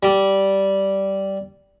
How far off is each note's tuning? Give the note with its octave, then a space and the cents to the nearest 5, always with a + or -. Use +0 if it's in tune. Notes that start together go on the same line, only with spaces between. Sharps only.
G3 -10